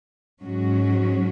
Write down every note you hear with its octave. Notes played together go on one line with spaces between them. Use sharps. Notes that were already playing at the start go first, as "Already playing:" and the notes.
G#2 F#3 C#4 F#4